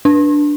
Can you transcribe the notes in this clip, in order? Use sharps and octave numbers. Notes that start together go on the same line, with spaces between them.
D4